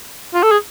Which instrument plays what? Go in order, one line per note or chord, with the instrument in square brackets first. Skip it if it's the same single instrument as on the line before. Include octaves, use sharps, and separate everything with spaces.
[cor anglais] F4
A4
G#4